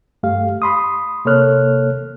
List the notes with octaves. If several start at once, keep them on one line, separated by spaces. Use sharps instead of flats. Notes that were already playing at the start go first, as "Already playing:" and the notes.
G2 A3 G4 F5
B5 C6 D#6
C3 A#3 A4 C#5 F6 F#6